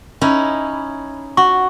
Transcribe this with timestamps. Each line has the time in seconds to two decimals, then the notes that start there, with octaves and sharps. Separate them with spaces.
0.21 C#4 D#4 E4
1.37 F#4 C#6